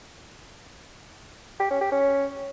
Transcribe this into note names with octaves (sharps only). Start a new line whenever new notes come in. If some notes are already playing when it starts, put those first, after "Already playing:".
G4
C#4
G4
C#4